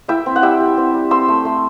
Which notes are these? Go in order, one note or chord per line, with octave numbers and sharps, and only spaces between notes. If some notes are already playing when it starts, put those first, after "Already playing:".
E4 E5 G5
C4
F#5
G3 E5 G5
G3
C4
G3
C4 C6 E6
A3
A3